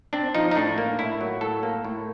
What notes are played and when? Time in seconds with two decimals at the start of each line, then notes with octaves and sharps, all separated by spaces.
0.13 C4 D4
0.35 F3 D#4
0.51 D#4
0.55 A2 D4
0.78 A#3
0.99 A2 E4
1.21 F#3
1.41 A2 A4
1.63 A#3
1.85 A2